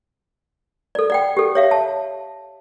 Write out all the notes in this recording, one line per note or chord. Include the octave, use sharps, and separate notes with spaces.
A4 D5
D5 F#5 G5
G4 A4
C#5 E5 F5
A5